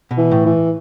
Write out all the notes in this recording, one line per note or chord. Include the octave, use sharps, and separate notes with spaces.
B2
E3
A2
E3